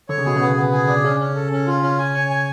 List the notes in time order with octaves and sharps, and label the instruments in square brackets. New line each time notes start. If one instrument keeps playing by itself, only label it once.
[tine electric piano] D3 [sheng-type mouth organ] C#5
[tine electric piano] C#3
[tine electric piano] B2 [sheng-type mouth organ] G#4
[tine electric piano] C#3 [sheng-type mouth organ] B3
[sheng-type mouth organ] B3
G#4
D4
[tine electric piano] C#3 [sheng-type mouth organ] C#4
[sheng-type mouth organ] C#4
A4
C#4
F4
C#4
G#5
C#5
G#5